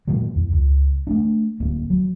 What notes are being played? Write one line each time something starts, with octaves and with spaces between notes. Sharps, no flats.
A#2 D#3 F#3 G#3
E2
C#2
A3 B3 D4
D1 A#3
F#3